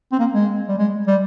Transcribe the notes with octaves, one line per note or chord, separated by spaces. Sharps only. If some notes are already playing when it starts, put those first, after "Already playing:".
C4
A#3
G#3
G3
G#3
G3